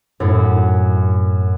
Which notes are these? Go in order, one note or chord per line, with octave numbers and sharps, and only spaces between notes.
F#2 A2